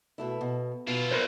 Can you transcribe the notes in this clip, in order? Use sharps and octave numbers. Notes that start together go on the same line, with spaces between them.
B2 A3 E4
B2
B2 E4 F4
A#4 C5